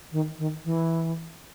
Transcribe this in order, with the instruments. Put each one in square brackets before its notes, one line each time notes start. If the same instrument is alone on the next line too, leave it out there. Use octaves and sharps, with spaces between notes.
[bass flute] D#3
D#3
E3